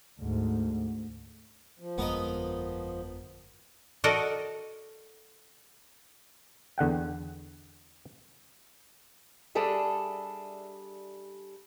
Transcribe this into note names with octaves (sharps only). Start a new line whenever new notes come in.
D2 G#2
F3
G1 F2 G#3 B3 A#4 D#5
F#4 A4 A#4 D5 D#5
E2 D3 F#5 G5
G3 D4 G#4 A4 E5